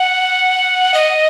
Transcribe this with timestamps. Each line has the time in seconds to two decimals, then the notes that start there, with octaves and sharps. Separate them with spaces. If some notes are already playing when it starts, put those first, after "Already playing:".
Already playing: F#5
0.94 D#5